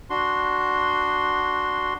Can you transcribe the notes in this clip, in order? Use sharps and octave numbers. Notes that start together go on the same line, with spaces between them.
D4 F#4 C6